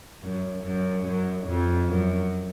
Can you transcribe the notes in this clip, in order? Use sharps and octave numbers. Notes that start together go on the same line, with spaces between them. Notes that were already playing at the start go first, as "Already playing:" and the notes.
F#2
F#2
F#2
F2
F#2